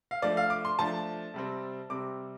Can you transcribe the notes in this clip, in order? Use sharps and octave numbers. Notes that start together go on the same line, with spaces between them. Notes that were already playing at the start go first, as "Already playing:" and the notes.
F5
F3 A3 D4 D5
F5
D6
C6
F3 A3 D4 A5
C3 G3 C4
C3 G3 C4 D6